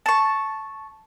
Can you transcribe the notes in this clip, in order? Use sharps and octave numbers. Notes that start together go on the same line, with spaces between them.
A5 C#6